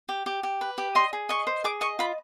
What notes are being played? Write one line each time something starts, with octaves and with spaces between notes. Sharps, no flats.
G4
G4
G4
B4
G4
D#5 C6
G#4
D#5 C#6
C5
G#4 D6
D#5 C#6
F4 B5